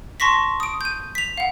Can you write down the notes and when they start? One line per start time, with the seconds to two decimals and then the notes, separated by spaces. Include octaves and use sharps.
0.20 A5 C6 C#6 A#6 B6
0.60 D#6 D7
0.81 G6 D#7
1.15 B6 F7
1.37 F5 F#5